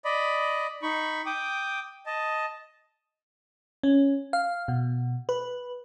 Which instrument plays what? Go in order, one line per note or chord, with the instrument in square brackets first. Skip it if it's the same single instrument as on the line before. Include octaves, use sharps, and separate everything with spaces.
[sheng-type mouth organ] D5 D#5 B5
D#4 B5 C#6
G5 D6 D#6
D#5 A5
[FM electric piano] C#4
F5
B2
B4